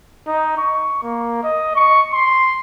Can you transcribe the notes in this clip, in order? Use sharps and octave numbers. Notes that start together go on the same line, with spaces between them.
D#4
C#6
A#3
D#5
C#6
C6